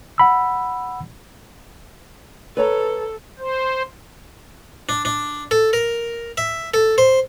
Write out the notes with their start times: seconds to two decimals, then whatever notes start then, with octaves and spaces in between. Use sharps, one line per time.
0.18 F#5 B5 E6
2.57 A4 B4 C#5 A#5
3.39 C5
4.89 D4
5.05 D4
5.51 A4
5.73 A#4
6.37 E5
6.74 A4
6.98 C5